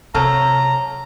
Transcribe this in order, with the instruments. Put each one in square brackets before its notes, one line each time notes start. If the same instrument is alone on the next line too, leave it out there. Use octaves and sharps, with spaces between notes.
[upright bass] C3 [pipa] F3 F#3 A4 [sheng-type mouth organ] A#5